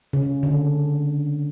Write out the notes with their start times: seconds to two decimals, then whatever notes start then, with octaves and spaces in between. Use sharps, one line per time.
0.13 C#3
0.43 D3